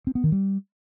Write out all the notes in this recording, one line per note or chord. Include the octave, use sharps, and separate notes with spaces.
C4
B3
D#3
G3